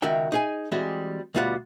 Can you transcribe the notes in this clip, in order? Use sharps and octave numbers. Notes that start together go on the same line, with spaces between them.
C#2 D#3 F#4 A#4 E5 G5
D#4 G#4 G#5
E3 G3 G#3 C4 F#4
D2 B2 G3 F4 A4 F#5